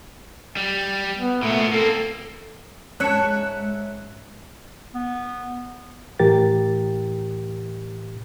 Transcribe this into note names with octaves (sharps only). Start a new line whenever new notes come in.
G3
B3
A#2 A3 B3
A#3 C4 A4
G#2 G#3 C#4 C#5 E5 A5 F#6 C#7
B3
A2 E3 G4 A#4 A6